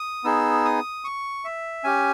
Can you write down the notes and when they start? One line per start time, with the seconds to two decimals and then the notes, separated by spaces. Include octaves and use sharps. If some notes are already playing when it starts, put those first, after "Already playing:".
Already playing: D#6
0.24 B3 D#4 G#4 E6
0.65 D#6
1.04 C#6
1.45 E5
1.84 C#4 G4 G#5